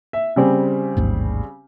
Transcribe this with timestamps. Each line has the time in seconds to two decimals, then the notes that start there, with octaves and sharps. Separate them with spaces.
0.13 E5
0.36 C#3 G3 C4
0.97 A1 D#2 G#2